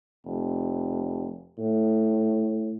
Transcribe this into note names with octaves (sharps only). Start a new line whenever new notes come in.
F1
A2